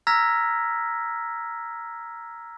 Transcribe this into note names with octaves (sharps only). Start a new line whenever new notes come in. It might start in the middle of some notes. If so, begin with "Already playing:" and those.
A#5 E6 F6 G#6 A#6 B6